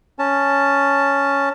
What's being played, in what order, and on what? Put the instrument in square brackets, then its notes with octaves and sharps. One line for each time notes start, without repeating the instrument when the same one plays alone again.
[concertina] C#4 A5